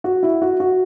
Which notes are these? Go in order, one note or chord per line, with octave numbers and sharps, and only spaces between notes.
F#4
E4
F#4
F#4